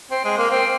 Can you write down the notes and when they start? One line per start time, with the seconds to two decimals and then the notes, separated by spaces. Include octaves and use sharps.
0.11 C4
0.24 G#3
0.38 A#3
0.51 C4